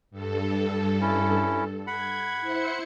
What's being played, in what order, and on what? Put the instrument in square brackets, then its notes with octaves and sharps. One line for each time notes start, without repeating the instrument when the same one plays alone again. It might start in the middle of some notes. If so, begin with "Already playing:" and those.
[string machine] G2 A4
[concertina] C#4 E4
[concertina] F#5 B5 [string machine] G#6
[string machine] E4 C5 C#7